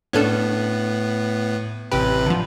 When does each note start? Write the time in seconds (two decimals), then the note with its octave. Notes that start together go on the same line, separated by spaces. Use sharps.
0.13 A2 B3 C#4 D4 A4
1.92 A1 C3 G4 B4
2.26 D3 F3